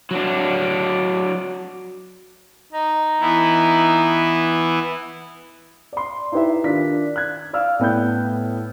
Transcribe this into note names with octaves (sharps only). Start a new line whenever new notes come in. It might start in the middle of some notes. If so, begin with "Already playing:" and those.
F#3 D4
D#4
E3 B3 E4
D5 C6
D#4 E4 G4 B4 D#5 E5
D#3 D4 F4 B6
F#6 G#6
D5 F5 E6 F6
A2 B3 G5 G6